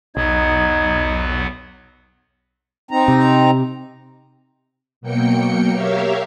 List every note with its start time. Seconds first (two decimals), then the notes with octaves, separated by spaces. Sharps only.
0.16 B1 E2 F#3 B3 D#4 G#6
2.91 C4 D#4 A#5
3.08 C3
5.01 B2 F#3 A#3 G5 C#7
5.72 G4 A#4 C#5 E5 F5